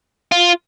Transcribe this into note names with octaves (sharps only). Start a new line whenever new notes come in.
F4